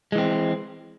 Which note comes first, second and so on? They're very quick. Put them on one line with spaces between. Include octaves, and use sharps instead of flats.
G#3 E3 C4